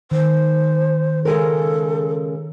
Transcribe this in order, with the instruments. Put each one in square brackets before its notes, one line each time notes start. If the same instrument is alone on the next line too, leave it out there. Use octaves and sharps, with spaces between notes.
[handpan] D#3 [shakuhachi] C5
[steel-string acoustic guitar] C#3 G#3 A#4 [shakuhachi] A4